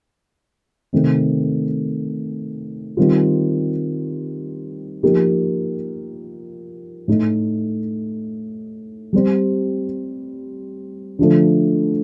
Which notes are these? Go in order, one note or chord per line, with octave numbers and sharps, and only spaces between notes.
C3 D#3 A3 C4
D#3 G3 C4 F4
F3 A#3 D#4 G4 A#4
A2 A3 D#4
G3 C4 G4 C5
D3 F3 A3